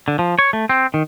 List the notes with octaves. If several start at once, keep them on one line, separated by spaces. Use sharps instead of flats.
D3
F3
C#5
A3
C4
D#3